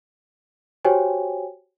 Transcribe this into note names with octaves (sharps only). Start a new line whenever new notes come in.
F#4 G4 C5 C#5 G5 G#5